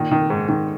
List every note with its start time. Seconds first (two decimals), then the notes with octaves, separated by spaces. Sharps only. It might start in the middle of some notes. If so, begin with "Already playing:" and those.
Already playing: A#2 D#3
0.11 D#3
0.30 G#2
0.48 D#3